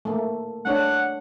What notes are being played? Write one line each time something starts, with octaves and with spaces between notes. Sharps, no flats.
A3 A#3
A3 D4 C#5 F#5